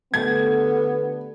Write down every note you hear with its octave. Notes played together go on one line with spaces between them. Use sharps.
D3 A3 B3 G4 G#6